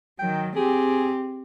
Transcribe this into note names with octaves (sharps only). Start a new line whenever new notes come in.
D#3 F#3 G5
C4 G4 G#4